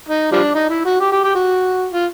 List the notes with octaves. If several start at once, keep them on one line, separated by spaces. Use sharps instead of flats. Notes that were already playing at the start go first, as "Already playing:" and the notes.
D#4
F3 G3 D4
D#4
E4
F#4
G4
G4
G4
F#4
F4